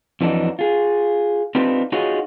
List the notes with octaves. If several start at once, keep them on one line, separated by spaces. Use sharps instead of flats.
F2 E3 F#3 D4 D#4
F4 G#4
C4 D4 D#4 F4 G4 B4
D#4 F4 F#4 G#4 C#5 D#5